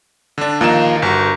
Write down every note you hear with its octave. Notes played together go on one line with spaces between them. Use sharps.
D3 D4
D#2 F3 A#3 D#4 F4 E7
G1 F#4 A#4